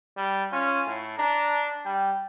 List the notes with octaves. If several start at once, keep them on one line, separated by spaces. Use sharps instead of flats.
G3
C#4 F4
A2
D4 A#5
G3 G5